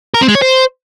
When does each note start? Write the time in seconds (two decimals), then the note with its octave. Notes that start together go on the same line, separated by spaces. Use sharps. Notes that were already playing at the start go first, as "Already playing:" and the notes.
0.14 A#4
0.21 C4
0.28 G#3
0.35 C#5
0.42 C5